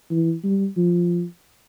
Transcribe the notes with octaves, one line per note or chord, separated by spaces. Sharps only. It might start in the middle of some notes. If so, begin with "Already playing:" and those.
E3
G3
F3